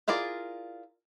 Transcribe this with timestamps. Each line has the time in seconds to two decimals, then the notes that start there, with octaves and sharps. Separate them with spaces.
0.08 E4 F4 G#4 A#4 D5